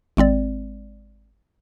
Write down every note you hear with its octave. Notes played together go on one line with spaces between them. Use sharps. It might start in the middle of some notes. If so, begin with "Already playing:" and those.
G#1 G#3 C4 D5